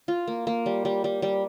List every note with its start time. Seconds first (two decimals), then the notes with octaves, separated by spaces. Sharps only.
0.08 F4
0.27 A#3
0.47 A#3
0.66 G3
0.85 G3
1.04 G3
1.22 G3